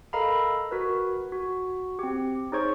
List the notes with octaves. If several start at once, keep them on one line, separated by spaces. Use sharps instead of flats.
A4 A#4 D#5 F5 A#5 B5
F#4 A#4 B4
F#4
C4 G4
D#4 G#4 C5 C#5 C#6